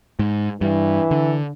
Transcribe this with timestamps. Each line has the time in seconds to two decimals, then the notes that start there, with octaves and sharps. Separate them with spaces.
0.19 G#2
0.61 G2 E3
1.11 D3